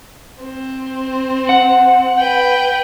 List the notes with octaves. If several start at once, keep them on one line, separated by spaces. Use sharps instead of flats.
C4
F#5
B4 G5